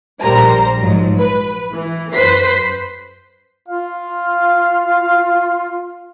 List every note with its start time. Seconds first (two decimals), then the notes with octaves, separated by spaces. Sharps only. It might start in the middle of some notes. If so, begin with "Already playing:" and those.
0.21 A#1 G3 A#4 C5 A#5
0.78 G#2 F3 F#3
1.18 B4
1.73 E3
2.13 F#2 B4 C5 B6 C7
3.69 F4 F5